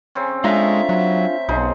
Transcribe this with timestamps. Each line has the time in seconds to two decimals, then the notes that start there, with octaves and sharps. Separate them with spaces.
0.15 C#3 C4 C#4
0.44 G#3 A3 D4 F4 E5 A#5
0.89 F#3
1.49 B1 C#3 F3 D#4